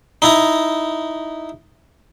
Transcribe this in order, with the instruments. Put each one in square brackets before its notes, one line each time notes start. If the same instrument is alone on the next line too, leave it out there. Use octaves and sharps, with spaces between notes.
[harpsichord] D#4 E4 A#5